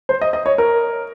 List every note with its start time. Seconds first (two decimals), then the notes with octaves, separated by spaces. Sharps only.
0.09 C5
0.21 D#5
0.33 D#5
0.46 C#5
0.58 A#4